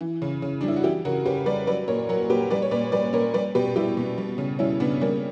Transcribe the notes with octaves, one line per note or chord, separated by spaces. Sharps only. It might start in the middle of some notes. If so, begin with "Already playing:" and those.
E3
C#3
C#3
G3 D4
E4
F#4
E3 E4 G4
C#3 F#4 A#4
C#3 G4 B4
G3 B4 D5
F#3 B4 D5
A#2 A#4 C#5
F#3 F#4 A#4
A#2 G4 B4
G3 B4 D5
C#5
A#2 B4 D5
G3 B4 D5
A#2 A#4 C#5
G3 B4 D5
B2 G4 B4
G3 E4 G4
B2
G3
C#3
G3 C#4 E4
C#3 B3 D4
G3 A#3 C#4